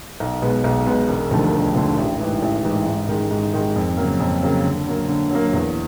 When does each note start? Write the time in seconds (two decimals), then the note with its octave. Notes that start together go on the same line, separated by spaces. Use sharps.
0.20 B1
0.42 B2 G#3 B3
0.64 B1
0.86 B2 G#3 B3
1.09 E1
1.31 D#2 D3 F3 A3
1.53 E1
1.76 D#2 D3 F3 A3
1.97 A1
2.20 G#2 E3
2.42 A1
2.65 G#2 E3
2.86 G#2
3.09 D#3 G#3
3.31 G#2
3.54 D#3 G#3
3.76 F2
3.97 C#3 F#3 A#3
4.20 F2
4.43 C#3 F#3 A#3
4.64 D3
4.87 F#3 A#3
5.08 D3
5.31 F#3 A#3
5.53 E2